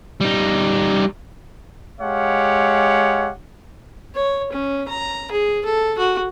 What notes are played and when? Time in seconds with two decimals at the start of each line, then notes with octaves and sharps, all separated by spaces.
0.21 G3 D#4
2.01 G#3 G4 C#5 F5 F#5
4.15 C#5
4.52 C#4
4.88 A#5
5.32 G#4
5.65 A4
5.98 F#4